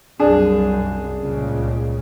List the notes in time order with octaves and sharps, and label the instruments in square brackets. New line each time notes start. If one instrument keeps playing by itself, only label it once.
[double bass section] C2 F#2 [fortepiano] D4 G#4
[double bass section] C#2 A#2 C#3